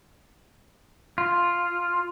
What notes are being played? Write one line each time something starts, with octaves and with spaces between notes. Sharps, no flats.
F4